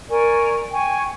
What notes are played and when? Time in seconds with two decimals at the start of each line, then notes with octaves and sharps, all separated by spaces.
0.09 A#4 D5 G#5 C#6
0.71 G5 G#5 C#6